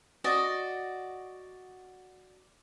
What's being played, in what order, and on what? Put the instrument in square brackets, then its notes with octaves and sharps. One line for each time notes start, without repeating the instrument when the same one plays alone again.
[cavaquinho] F#4 D5 D#5